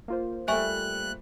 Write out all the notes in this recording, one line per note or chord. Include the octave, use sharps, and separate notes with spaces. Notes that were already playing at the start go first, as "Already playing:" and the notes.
A#3 F4 C5
G3 A3 E5 G#5 C#6 F#6